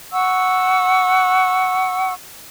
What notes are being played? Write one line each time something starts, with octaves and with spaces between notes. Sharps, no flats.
F#5 C#6 E6